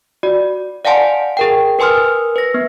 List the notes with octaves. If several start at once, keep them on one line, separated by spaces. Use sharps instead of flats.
F#4 D5
D5 F5 F#5 G#5 A5 C6
G#4 A#4 G5
A#4 B4 G#5 C6 D#6 F6
B4 A#6
B3